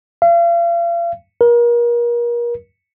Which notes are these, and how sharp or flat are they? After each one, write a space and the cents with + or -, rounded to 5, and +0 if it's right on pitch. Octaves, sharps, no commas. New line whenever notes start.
F5 -40
A#4 +35